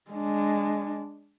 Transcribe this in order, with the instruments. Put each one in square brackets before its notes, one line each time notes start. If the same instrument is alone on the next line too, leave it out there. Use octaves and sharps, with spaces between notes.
[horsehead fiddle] G#3 D4